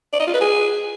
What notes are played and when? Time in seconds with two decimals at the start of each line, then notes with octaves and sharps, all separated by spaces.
0.13 D5
0.20 D#5
0.27 F4
0.34 B4
0.41 G#4